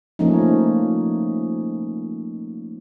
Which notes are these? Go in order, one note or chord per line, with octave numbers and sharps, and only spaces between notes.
F3 A3 A#3 C#4 D#4